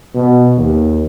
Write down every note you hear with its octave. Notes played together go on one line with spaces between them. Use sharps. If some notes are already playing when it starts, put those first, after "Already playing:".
B2
D#2